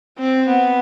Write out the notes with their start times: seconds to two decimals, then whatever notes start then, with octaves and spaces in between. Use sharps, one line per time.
0.19 C4
0.48 B3